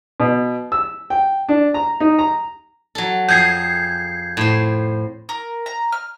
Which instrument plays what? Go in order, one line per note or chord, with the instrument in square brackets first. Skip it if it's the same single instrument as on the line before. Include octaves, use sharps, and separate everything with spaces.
[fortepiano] B2
E6
G5
D4
A#5
D#4
A#5
[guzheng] F#3 A4
[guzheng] F2 G#4 [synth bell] G6 G#6 C7
[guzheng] A2 C5
[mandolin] A#4
A#5
F6